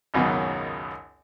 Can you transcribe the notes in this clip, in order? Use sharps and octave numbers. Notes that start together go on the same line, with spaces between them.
G#1 C#2 F#2 B2 D#3 C#4